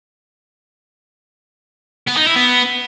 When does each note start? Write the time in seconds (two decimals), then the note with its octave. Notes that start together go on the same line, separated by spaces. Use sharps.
2.07 B3
2.17 D#4
2.26 E4
2.36 B3